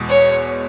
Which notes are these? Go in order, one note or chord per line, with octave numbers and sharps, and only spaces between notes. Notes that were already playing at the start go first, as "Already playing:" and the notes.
Already playing: E2 B2 G#3
C#5